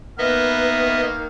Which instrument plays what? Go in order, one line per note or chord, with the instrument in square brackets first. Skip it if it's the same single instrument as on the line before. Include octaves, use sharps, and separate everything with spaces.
[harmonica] D#3 A#3 F6 [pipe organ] B3 D#5 E5 [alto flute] B4